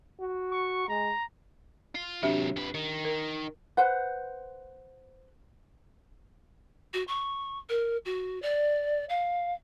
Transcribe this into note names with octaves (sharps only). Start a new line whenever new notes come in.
F#4
C#6
G#3 A#5
F4
C3 F#3 D4 G4 E5
F2 B4
D#3
A#4
B4 C5 F#5
F#4
C#6
A#4
F#4
D5
F5